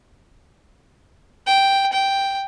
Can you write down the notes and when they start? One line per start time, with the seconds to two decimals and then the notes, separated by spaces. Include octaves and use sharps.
1.47 G5
1.93 G5